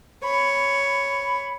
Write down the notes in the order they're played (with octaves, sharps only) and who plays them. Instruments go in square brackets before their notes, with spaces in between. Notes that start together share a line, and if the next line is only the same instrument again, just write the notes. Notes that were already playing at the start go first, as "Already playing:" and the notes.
[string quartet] C#5 [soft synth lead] B5